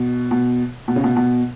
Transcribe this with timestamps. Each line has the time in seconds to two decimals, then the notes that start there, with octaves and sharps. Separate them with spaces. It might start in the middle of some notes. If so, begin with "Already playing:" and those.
Already playing: B2
0.31 B2
0.88 B2
0.96 C#3
1.04 B2
1.16 B2